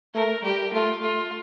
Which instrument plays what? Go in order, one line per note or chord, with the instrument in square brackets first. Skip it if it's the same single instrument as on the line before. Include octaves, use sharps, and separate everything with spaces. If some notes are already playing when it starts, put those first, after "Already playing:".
[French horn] A3 [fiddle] A#4
[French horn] G3 [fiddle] G4
[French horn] A3 [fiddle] F4
[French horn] A3 [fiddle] F4